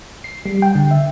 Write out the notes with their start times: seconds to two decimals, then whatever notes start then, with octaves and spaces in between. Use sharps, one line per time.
0.24 C7
0.46 G3
0.62 G5
0.75 D3
0.91 E5